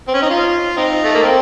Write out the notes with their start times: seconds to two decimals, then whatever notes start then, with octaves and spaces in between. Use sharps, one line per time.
0.08 C4
0.14 C#4
0.22 D#4
0.30 F4
0.77 C4 D#4
1.04 A3
1.14 A#3
1.23 C4